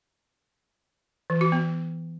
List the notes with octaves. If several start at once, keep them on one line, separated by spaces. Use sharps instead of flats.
E3
F#4
B3